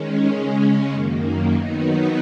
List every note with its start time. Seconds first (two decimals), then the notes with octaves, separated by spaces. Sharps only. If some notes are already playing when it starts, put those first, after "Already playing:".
Already playing: D#3 G#3 C#4
0.32 C#3 G#3 C#4
0.92 F#2 D#3 A#3
1.52 D#3 F#3 B3 D#4